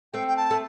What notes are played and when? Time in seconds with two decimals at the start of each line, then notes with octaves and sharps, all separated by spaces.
0.14 A3 C4 G5
0.28 G5
0.36 A5
0.51 A3